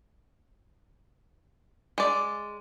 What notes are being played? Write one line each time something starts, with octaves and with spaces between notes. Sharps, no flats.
G#3 D5